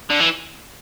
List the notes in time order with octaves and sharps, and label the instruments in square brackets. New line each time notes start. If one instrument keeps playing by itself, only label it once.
[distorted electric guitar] D3
E3